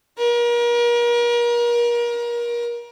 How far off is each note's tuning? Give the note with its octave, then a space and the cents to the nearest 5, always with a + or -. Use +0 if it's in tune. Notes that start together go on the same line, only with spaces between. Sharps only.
A#4 +35